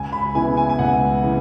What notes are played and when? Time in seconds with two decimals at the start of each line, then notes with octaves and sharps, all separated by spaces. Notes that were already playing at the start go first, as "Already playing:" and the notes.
Already playing: C#2 G#5
0.12 B5
0.35 C#3 E3 B3 E4 G#5
0.57 G#5
0.69 G#5
0.79 C#2 F#5
1.23 C#3 E3